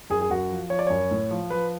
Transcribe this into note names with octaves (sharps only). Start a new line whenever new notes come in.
F#2 G#4
G#4
F#2 F#4
F3
F3 C#5
D5
F#2 C#5
A2
F3
F3 B4